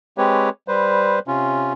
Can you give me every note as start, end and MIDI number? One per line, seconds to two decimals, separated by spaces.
0.18 0.49 56
0.18 0.49 60
0.18 0.49 67
0.18 0.49 71
0.18 0.49 73
0.68 1.19 55
0.68 1.19 71
0.68 1.19 72
1.28 1.73 48
1.28 1.73 61
1.28 1.73 65